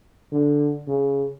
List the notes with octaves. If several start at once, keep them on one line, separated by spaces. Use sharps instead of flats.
D3
C#3